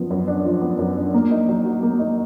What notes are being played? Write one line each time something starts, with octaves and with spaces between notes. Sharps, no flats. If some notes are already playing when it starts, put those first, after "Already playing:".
Already playing: F#2 F3 B3 D4
F#2
D4
F3
B3
F#2
D4
A#3
D#4
F#3
F#4
A#3
D#4